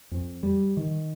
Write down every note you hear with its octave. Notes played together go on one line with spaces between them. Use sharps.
F2
G3
D#3